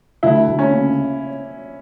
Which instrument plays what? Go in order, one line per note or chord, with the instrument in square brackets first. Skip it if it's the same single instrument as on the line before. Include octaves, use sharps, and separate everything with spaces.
[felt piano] D2 [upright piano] E4
[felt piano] D2
[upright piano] C#4
[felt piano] C#3